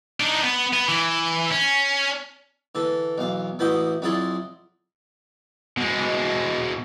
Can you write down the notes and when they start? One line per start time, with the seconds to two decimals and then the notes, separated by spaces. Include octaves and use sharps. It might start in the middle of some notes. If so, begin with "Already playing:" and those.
0.20 D4 D#4
0.43 B3
0.73 B3
0.89 E3
1.52 C#4
2.75 D3 E3 A4
3.18 B1 E2 F5
3.59 A1 B3 E4 F#4 G5 D#6
4.02 F2 F#3 E4 G#4 D5 C6
5.77 B2 G#3